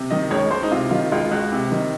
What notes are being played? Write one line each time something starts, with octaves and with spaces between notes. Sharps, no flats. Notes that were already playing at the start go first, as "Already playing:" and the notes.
Already playing: C3
D#3 D#5
C#2 C#5
C#2 C5
D#4
C3 F4
D#3 F4
C#2 F4
C#2 F#4
C3
D#3